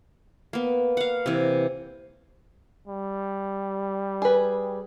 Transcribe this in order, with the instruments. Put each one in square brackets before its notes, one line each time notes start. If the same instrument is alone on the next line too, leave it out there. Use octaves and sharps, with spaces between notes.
[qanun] A#3 B3
F5 F#5
C3 E3
[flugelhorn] G3
[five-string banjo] G#4 B4